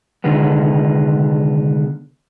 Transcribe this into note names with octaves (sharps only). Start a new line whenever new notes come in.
C2 D3 D#3 G#3 B3